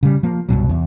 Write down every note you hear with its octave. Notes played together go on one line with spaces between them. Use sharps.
C#3 G3
F3 A#3
C2 G2 B2 F#3
E2